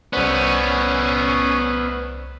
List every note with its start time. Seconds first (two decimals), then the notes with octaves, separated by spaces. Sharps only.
0.13 C2 A3 B3 C#4 C5 D5